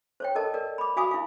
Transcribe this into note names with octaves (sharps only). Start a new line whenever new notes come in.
C5 C#5 G5
A4 A#4 D#5 A5
A#4 D5
B5 D6
F#4 F5 G#5 B5 D6 D#6
E4 F5